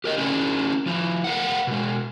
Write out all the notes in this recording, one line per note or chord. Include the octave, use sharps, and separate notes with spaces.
G4 A#4 D#5
C#4 D4 E4 G#4 A#4
F3 E4
A#4 B4 F5 F#5
B2 G#3